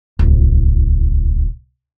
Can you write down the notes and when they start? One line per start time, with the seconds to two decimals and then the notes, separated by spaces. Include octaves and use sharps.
0.19 D1 C2